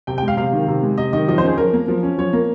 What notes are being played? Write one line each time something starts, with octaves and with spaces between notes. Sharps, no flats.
C3 G5
G5
G#3 F5
C3 F5
D#3
C3
G#3
C3 D#5
D#3 D#5
F3 D#5
C5
C#4
G#4
F3 A#4
A#3
F3
C#4
F3 C#5
A#3